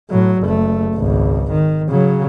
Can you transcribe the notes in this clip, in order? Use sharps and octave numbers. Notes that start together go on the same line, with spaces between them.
A2 F#3
F#1 A3
G#1 C#2
D#3
C#3 F#3